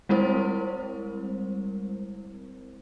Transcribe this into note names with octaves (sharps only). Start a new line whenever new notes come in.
G3 G#3 C4 E4 A#4 C5